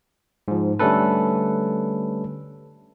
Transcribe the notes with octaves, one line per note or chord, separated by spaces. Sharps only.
G#2 F3
D3 G3 A3 C#4 A4 B4